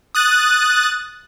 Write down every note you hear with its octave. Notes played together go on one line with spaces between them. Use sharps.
D#6 F#6 A6